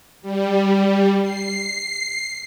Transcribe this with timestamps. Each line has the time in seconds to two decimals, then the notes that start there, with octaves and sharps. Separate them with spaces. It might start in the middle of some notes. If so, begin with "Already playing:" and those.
0.22 G3
1.22 C7